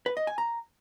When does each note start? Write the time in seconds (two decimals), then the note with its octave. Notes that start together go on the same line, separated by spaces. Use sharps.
0.06 B4
0.17 D#5
0.27 G#5
0.38 A#5